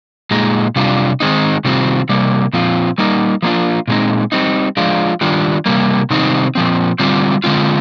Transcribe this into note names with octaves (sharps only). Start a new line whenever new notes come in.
A#2 G#3 D#4
C3 G3 D4 F4
D#3 G#3 C4 D#4
C3 D#3 G3 C4 F4
C3 G3 A#3
A#2 F3 C4 F4
G3 A#3 D#4
F3 A#3 D4 F4
A#2 G#3 C4 D#4
G3 C4 D#4
F3 G#3 D4 F4
D#3 G3 D4 F4
C3 G3 A#3
C3 D#3 G3 C4 D#4
A#2 F3 C4
D3 G3 C4 F4
D3 G#3 C4 F4